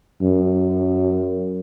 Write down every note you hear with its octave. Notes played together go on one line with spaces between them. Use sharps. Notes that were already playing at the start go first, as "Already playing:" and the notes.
F#2